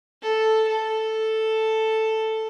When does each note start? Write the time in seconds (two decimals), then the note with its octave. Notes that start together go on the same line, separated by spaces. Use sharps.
0.22 A4
0.68 A4